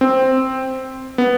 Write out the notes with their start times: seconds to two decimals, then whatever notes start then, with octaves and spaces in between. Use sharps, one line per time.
0.01 C4
1.18 B3